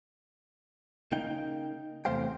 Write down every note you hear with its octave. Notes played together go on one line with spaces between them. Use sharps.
C#3 A#3 D#4 G5
E2 C3 A3 C5 F5 G5